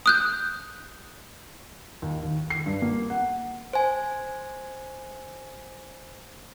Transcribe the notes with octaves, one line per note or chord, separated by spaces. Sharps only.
D#6 F#6 G6
D#2
D#2
C7
G2
A#3
F#5
C5 G#5